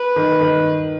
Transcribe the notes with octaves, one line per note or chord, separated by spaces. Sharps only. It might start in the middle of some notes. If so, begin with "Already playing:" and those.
Already playing: B4
D#3
D#3